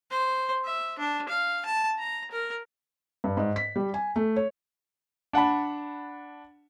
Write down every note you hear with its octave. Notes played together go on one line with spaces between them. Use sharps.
C5
E5
D4
F5
A5
A#5
A#4
G2
G#2
B6
G3
G#5
A3
C#5
D4 F#5 A5 B5